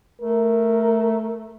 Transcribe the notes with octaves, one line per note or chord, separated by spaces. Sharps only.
A3 A#4